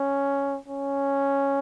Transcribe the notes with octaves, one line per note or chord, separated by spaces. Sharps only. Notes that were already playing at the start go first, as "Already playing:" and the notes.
Already playing: C#4
C#4